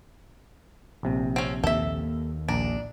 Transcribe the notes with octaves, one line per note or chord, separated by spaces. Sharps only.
A#1 C3
C4 C#4
D#2 A#3 A4 E5
A#1 D4 A#5